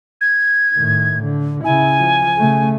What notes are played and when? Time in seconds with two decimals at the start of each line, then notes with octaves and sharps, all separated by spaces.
0.21 G#6
0.73 A2 D#3
1.23 D3
1.64 C#3 E4 G#5
1.98 F3
2.37 C#3 A3